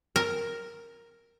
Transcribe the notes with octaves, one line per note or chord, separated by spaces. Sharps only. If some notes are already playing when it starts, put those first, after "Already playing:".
A#4